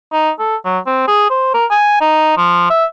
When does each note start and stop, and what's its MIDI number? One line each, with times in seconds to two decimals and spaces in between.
0.13 0.30 63
0.39 0.56 69
0.65 0.79 54
0.86 1.06 60
1.08 1.29 68
1.30 1.50 72
1.54 1.65 70
1.70 1.97 80
2.01 2.35 63
2.37 2.68 53
2.70 2.85 76